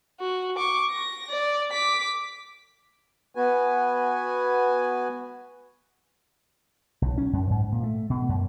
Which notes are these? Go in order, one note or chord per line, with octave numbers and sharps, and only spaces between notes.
F#4
C#6 D6
A#6
D5
D6 B6
B3 F#4 B4 G#5
B1
C#4
F#2
G#2
A#2
A3
B2
F#2